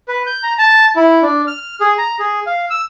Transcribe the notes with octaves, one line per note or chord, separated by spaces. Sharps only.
B4
G6
A#5
A5
E4
D4
F6
G#4
A#5
G#4
F5
E6